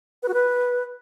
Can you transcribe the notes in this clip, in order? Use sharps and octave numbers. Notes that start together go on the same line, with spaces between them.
B4
F#4
B4